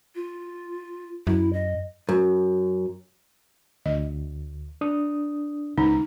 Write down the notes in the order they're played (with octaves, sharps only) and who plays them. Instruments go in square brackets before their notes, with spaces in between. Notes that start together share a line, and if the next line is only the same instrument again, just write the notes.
[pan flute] F4
[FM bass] F#2 [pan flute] E4
[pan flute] D#5
[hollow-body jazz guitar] F#2
[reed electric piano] D2 [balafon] D#5
[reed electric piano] D4 D#6
[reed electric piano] C#2 A#5 [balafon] D#4